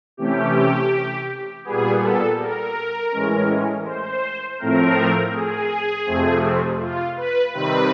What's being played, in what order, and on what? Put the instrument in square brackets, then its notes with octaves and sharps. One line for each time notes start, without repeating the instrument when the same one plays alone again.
[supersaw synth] C3 E3 A3 C#4 G4
A#2 G3 B3 G#4
A4
A#4
A2 E3 G#3 C#4
C5
A2 F3 A3 C4 A#4
G#4
F2 C3 F3 A3 C4
F4
B4
C3 D#3 G3 C4 B4